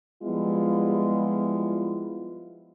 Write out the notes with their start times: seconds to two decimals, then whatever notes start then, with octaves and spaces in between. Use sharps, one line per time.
0.23 F3 G3 G#3 B3 E4 F4